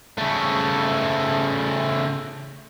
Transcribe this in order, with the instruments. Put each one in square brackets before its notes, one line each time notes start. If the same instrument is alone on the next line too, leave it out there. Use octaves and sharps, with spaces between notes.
[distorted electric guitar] C#3 A3